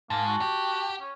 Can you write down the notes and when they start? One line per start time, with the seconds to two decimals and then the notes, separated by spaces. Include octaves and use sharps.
0.10 G#2 A#3 A5
0.26 F#4
0.41 G4
1.00 C#4